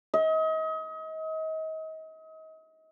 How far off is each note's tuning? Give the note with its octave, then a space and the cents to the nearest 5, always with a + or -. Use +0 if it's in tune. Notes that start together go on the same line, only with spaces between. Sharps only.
D#5 +35